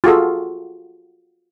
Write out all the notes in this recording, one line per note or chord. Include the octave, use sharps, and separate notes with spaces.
F4 F#4 G#4 A4